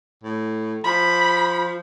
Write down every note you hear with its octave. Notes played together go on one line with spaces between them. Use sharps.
A2
F3 B5